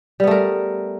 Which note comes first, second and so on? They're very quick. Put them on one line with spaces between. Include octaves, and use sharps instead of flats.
G3 B3 A3 A#4